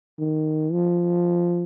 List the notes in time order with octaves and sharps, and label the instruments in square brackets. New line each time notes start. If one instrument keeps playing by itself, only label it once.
[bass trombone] D#3
F3